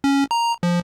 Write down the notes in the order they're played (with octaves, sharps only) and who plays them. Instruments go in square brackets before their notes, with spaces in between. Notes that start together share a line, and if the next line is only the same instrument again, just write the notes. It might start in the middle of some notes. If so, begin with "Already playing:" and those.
[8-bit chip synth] C#4
A#5
F3